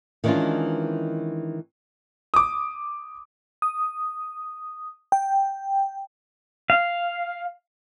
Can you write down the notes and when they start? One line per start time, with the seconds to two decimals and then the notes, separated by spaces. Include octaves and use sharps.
0.24 D#3 E3 G#3 C#4 D4 F4
2.34 D6 D#6
3.62 D#6
5.12 G5
6.70 F5